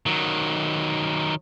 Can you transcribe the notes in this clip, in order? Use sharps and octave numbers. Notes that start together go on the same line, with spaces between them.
D#3 F#3